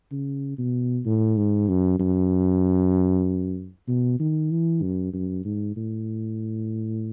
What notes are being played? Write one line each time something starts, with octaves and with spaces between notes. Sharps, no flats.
C#3
B2
A2
G#2
F#2
F#2
B2
D#3
E3
F#2
F#2
G#2
A2